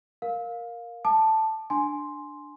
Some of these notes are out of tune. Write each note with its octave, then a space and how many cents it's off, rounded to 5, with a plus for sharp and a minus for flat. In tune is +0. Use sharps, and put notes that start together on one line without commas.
A#4 +0 F5 +15
A5 +0 D6 +40
D4 +5 G#5 +10 C6 +0